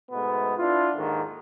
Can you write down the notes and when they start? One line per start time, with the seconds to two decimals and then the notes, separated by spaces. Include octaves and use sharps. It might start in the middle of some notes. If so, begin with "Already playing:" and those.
0.11 G#2 B2 A3 B3
0.58 D4 E4 F4
0.95 D#2 G#2 D3 D#3